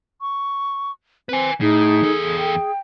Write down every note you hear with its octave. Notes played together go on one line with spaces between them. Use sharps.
C#6
C4 B4 G#5
A2 D#4 G#4
E2 A4
G5